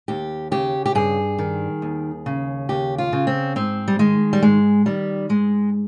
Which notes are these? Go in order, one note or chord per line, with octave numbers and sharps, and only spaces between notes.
D#2 G4
C#3 G4
G4
G2 G#4
D#3
D#2
C#3
D#2 G4
F4
C#3
C4
G#2 C4
G3
D#3 G#3
G3
G#2 G#3
D#3 G3
G#2 G#3